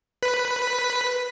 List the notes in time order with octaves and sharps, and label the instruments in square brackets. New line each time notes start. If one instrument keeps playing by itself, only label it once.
[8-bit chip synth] B4 B6